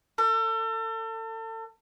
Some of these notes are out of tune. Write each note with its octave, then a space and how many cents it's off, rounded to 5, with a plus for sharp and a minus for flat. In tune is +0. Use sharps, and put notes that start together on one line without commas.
A4 +35